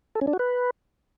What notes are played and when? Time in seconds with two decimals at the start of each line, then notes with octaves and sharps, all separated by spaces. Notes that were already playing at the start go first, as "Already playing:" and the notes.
0.15 A4
0.21 C#4
0.27 D4
0.33 F#4
0.39 B4